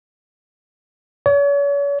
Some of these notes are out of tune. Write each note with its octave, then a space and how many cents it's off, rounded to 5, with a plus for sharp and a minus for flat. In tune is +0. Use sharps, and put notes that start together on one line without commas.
C#5 +40